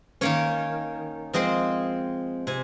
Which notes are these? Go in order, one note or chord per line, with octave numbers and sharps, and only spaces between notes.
D#3 A#3 C#4 C#5
F3 G#3 C4 D#5
C3 G#5